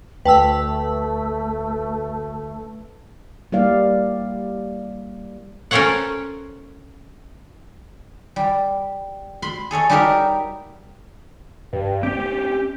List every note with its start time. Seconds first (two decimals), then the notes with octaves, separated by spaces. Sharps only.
0.25 D2 A3 B4 G5 A5 E6 B6
3.52 G3 A#3 E4 D5 F5
5.71 C#4 A4 A#4 C5 C#5 F#5
8.36 G3
9.42 B5 C6
9.71 G#4 A4 C#5 D#5
9.90 G3 D#4 F#4 G4 A#4 E5
11.73 G2
12.03 C4 C#4 G4